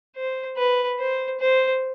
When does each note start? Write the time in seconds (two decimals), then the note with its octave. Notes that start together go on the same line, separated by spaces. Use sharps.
0.16 C5
0.57 B4
0.99 C5
1.40 C5